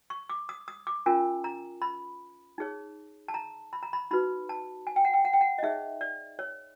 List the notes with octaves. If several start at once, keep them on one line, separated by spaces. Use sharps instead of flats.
C#6
D6
D#6
D#6
D6
C#4 F4 A#4 G#5
A#5
B5
D#4 G#4 C#5
A5
A#5
B5
A#5
B5
D#4 F#4 B4 B5
A5
G#5
G5
F#5
G5
F#5
G5
F#5
D#5
D#4 G#4 C#5 E5
D5
C#5